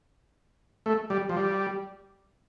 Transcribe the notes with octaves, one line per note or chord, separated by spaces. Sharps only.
A3
G3
F3
G3